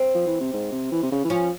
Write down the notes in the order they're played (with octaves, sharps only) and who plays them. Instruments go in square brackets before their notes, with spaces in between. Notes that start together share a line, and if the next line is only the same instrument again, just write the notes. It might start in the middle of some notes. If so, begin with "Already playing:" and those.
Already playing: [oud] C4
[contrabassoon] F3
E3
C3
G#2
C3
E3
C3
C#3
E3
[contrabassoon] F3 [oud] C#4